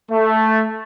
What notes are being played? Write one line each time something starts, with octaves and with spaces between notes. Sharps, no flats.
A3